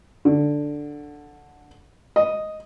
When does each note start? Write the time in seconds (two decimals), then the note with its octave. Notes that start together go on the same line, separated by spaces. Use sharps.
0.25 D3
2.16 D#5